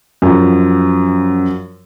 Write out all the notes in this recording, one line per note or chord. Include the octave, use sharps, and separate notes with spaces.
F#2 F3